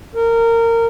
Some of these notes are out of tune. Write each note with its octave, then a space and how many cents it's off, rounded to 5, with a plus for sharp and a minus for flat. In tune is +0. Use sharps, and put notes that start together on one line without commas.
A#4 -20